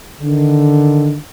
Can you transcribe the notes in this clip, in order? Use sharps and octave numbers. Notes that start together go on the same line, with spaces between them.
D3 D#3